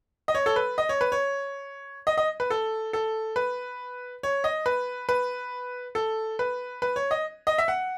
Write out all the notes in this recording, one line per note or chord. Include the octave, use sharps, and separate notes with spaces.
D#5
C#5
A4
B4
D#5
C#5
B4
C#5
D#5
D#5
B4
A4
A4
B4
C#5
D#5
B4
B4
A4
B4
B4
C#5
D#5
D#5
E5
F#5